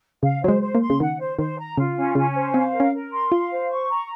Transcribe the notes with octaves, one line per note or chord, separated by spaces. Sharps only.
C#3 F5
F#3 C5
G#3
C5
A#3
C6
C#3
D#3 F#5
C5
D#3 C5
A#5
C#3 F4
C#4
C#3 C#4
C5
C4 F5
A#4
C#4
A#4
C6
F4 F5
C5
C#6
A#5